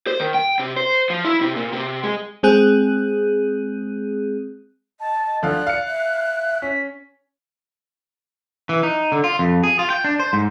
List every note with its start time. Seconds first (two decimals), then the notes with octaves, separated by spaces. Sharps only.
0.07 C5
0.20 D#3
0.34 G5
0.59 C3
0.77 C5
1.10 F3
1.25 E4
1.41 C3
1.56 A#2
1.72 C3
2.03 G#3
2.43 G#3 C4 G#4 F#6
5.00 D#5 A5
5.42 D2 F3 D5 F5 F#6
5.67 F5 C#7
5.88 E5
6.62 C#4 B6
8.69 E3
8.83 D#4
9.12 D3
9.24 F4
9.39 F2
9.63 G#4
9.79 F4
9.90 G5
10.04 D4
10.20 C5
10.33 G#2